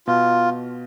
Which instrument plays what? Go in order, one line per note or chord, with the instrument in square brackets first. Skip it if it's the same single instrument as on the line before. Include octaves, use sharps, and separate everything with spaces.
[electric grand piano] B2 [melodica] F4